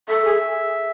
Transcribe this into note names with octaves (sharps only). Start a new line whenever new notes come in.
A4 E5
G#4